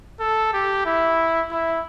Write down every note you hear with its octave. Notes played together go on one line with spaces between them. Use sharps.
A4
G4
E4
E4